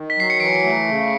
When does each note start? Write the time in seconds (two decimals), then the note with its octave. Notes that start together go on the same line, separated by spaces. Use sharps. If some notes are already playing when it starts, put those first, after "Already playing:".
Already playing: D#3
0.10 B6
0.17 F#3 C7
0.30 C#7
0.40 E3 C7 D7
0.63 A3
0.88 C#3